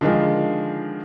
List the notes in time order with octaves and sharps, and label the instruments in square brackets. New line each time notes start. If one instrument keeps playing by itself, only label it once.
[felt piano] D3 D#3 F3 G#3